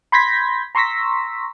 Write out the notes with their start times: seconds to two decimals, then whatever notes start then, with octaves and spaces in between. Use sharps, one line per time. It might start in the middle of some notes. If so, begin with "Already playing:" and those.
0.12 B5 C6 G6 G#6 A#6 B6
0.75 A#5 C6 C#6 E6 A#6 B6